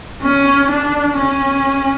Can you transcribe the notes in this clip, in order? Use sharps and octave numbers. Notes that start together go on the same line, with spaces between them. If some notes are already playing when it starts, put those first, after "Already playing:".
C#4
D4
C#4